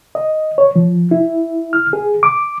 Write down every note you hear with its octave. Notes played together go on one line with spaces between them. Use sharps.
D#5
C#5
F3
E4
F6
G#4
D6